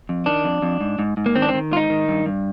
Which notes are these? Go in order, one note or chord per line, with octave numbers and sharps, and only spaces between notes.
F2
D#3 D4
F2
F2
G#2
G#2
G#2
A#3
D#3 C4
D4
C4
D#3
G#2 F4
D#4
D#3
G2
G2